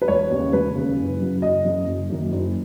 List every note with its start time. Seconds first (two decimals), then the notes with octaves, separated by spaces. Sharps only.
0.02 B4
0.08 E1 C#5
0.31 D#2 C#3
0.53 E1 B4
0.76 D#2 C#3
0.98 F#1
1.20 F#2 C#3 F#3
1.42 F#1 D#5
1.65 F#2 C#3 F#3
1.87 F#1
2.10 F#2 D#3 A#3
2.32 F#1